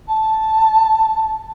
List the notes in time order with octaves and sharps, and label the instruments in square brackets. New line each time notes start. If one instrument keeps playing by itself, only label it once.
[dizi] A5